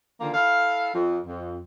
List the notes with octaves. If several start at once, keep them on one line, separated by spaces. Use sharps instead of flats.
D3 D#3 F3 A#3
E4 A4 F5
F2
F2